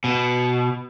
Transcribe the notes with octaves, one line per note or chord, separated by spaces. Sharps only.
B2